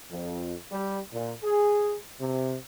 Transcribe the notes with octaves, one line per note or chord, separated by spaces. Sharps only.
F2
G3
A#2
G#4
C3